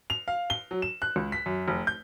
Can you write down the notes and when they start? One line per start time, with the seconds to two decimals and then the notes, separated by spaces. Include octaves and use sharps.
0.10 F7
0.28 F5
0.50 G7
0.71 F#3
0.82 E7
1.02 F#6
1.16 C#2
1.32 B6
1.46 F#2
1.68 F1
1.87 G6